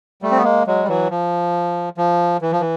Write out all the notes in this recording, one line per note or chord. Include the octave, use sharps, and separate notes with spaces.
G3 A3
C4
B3
G#3 A#3
F#3 G#3
G3
E3 F#3
F3
F3
E3
F3
E3